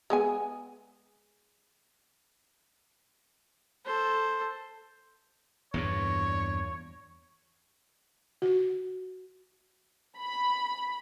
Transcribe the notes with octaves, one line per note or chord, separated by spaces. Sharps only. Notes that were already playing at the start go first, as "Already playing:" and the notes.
G#3 B3 G#5
A4 C5
E2 G2 A#2 C#5
F#4
B5